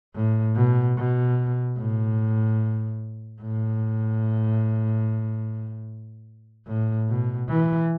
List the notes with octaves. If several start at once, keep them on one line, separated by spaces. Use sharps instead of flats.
A2
B2
B2
A2
A2
A2
B2
E3